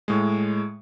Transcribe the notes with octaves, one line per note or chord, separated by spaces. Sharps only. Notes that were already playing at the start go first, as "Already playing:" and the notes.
A2 G#3